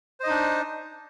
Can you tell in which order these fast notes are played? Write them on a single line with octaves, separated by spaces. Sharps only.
C5 D#5 D#4 D4